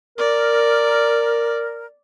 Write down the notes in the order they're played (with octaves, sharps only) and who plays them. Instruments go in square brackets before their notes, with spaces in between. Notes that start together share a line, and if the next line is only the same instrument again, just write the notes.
[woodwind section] A#4 [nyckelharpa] D5